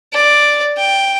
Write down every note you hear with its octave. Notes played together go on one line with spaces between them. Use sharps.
D5
G5